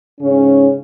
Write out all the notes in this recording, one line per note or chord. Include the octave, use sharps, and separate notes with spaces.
G#2 C#3 C#4